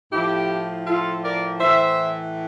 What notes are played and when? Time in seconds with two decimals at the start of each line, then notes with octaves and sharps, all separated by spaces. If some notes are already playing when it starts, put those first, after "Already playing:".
0.11 A2 F3 E4 G4
0.86 F4 A4
1.23 A#4 D5
1.61 A2 E3 C5 E5